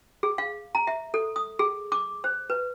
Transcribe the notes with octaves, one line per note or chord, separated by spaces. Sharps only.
G#4
F5
A#5
E5
A4
D#6
G#4
D6
C5
B4